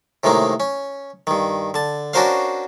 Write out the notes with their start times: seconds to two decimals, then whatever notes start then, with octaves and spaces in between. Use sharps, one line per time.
0.24 A2 C3 D#3 G#3 A#3
0.60 C#4
1.27 G2 D#3
1.74 D3 A5
2.14 C#4 D4 F#4 A#4 C5 F5